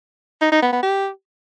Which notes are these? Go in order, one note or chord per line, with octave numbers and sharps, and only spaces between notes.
D#4
D#4
B3
B3
G4